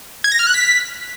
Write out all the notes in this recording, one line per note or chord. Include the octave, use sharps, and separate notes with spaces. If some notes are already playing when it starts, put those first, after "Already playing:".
G#6
A#6
F6
F#6
B6